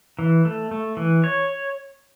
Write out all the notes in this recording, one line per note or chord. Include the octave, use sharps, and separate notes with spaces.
E3
A3
A3
E3
C#5